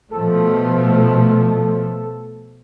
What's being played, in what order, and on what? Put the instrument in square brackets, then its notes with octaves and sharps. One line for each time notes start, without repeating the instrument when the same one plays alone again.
[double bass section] B2 F3 A3 [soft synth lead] A4